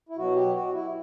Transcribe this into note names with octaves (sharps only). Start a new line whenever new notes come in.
E4
B2 F#3 F#4
G4
F#4
E4